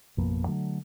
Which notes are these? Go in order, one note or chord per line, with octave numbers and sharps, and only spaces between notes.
A1 F2 B2 A#3
D3 F#3 A3